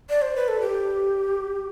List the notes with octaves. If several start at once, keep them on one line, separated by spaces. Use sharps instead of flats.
D5
C5
B4
A4
G4